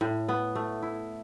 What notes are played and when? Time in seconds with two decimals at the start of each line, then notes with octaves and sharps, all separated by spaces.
0.01 A2
0.29 B3
0.55 A3
0.82 E4